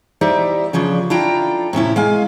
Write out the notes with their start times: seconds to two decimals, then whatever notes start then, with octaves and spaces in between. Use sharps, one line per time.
0.21 D#4 E4 G4 C5 D5 E5
0.73 C#3 F3 C#4 D4
1.10 D4 E4 F4 A4 G5 A#5
1.73 A2 C3 C#4 E4
1.96 G#3 F5 G#5